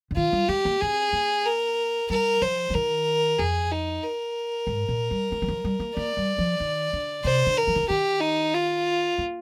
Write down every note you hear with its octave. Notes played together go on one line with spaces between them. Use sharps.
D3
D#3 F4
G3
G#3 G4
A#3
C4 G#4
A#3
A#4
G3 A#4
F3 C5
F3
D#3 A#4
F2 G#4
D#4
A#4
G#2
A#2
G3
G#3
G3
F3
G3
A#3
A#3 D5
G3
F3
D#3
D3
C3 C5
D3
A#4
F3
D#3
D3
D#3 G4
D#4
F4
A#3